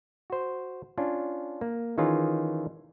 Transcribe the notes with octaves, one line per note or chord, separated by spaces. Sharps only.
F#4 C5
C#4 D4 F4
A#3
D#3 E3 C#4 D#4 F4 G#4